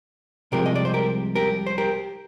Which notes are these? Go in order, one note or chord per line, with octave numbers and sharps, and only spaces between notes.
C2 C3 F3 G#3 G4 A#4
D#5
D5
C5
G4 A#4
G4 A#4
C5
G4 A#4